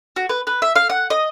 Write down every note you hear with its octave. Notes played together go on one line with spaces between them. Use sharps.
F#4
B4
B4
E5
F5
F#5
D#5